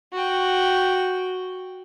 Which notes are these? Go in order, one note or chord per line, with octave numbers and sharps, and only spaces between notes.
F#4 G5